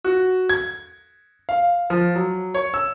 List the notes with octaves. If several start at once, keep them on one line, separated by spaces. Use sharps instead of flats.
F#4
G#6
F5
F3
F#3
C#5
E6